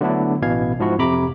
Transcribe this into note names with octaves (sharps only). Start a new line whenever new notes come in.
D3 F#3 A3 B3 D4 E4
A1 B2 E3 F5 G#6
G#2 F3 E4 F#4
F2 C3 A#5 B5 D6